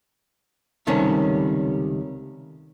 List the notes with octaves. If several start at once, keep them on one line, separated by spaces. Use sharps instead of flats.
C#2 C3 D#3 G3 A3 C#4